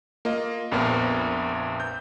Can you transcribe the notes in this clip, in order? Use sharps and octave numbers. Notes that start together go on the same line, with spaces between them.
A#3 F4 D#5 F5
A#1 F2 A#2 A#3 B3 F6
G6